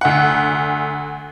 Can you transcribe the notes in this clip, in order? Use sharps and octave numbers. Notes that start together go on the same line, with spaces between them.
D2 F#5